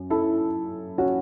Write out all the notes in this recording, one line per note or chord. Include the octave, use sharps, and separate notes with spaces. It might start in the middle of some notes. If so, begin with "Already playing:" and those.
Already playing: F#2
E4 A4
C#4 F#4